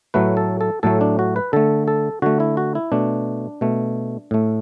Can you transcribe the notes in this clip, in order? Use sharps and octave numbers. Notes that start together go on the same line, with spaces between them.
A2 F#3 A3 B4
A4
A4
A2 F#3 A3 A4
D4
F#4
B4
D3 A3 A4
A4
D3 A3 F#4
E4
F#4
E4
B2 A3 D4
B2 A3
A2 A3